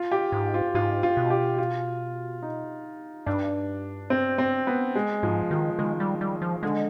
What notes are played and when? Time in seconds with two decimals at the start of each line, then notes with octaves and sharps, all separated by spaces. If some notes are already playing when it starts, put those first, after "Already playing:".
Already playing: F4
0.12 G4
0.32 G#2
0.54 F4
0.75 G#2 F4
1.03 F4
1.17 B2
1.30 G4
1.58 F4
2.42 D#4
3.26 G2 D4
4.10 C4
4.38 C4
4.67 B3
4.95 G#3
5.23 G#2 F3
5.51 D#3 F3
5.78 D#3 G#3
6.00 G3
6.21 G3
6.42 F3
6.63 D3 G#3